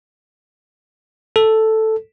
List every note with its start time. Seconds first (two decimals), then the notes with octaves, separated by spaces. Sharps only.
1.36 A4